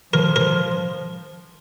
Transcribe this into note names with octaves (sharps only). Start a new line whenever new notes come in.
F3 A#4
A#4